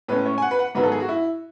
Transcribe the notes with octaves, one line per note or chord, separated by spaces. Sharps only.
A2 G#3 C#4 B4
C#5
G#5
F#5
B4
F#5
G#2 D#3 F#3 B3 B4
A4
G#4
F#4
E4